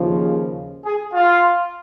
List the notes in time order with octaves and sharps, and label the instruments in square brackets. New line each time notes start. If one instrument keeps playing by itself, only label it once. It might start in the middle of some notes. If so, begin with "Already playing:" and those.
Already playing: [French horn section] D#2 C#3 F3
[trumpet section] G#4
F4